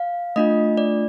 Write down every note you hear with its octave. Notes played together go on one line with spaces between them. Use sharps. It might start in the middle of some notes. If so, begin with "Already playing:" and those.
Already playing: F5
A3 D4 F4 D#5
D5